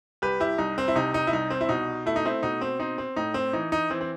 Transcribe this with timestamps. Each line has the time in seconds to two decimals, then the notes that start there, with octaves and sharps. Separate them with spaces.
0.22 C2 G4 B4
0.40 E4 G4
0.58 C2 D#4
0.78 C4
0.88 E4
0.95 C3 D#4
1.14 D#4
1.27 E4
1.33 C2 D#4
1.50 C4
1.61 E4
1.69 B2 D#4
2.06 A3 E4
2.16 D#4
2.25 C4 E4
2.43 B2 D#4
2.61 C4
2.80 C4 D#4
2.98 C4
3.16 A2 D#4
3.34 C4
3.53 E3 D#4
3.72 D#4
3.90 E3 C4
4.01 C4